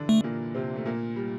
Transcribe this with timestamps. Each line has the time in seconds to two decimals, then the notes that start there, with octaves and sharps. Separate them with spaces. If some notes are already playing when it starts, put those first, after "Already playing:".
Already playing: D3 E3 D4 E4
0.09 A3
0.24 A#2 A#3
0.55 C3 C4
0.76 A3
0.85 A#2 A#3
1.16 G3